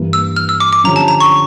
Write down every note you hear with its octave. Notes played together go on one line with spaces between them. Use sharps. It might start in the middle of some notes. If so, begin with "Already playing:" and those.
Already playing: G2 E3 A#3
E6
F6
E6
D6
D6
D3 F3 C#4 G4 C#5 A#5
A5
A#5
C#6